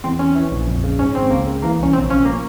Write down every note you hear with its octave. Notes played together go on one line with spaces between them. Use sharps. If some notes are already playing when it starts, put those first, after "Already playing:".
E2 C4
E2 C#4
E3
A#1
F2
C#3
G#2 C#4
G#1 C4
C#2 A#3
C#3
E3 A#3
C2 C#4
A#1 C4
F3 C#4
A#3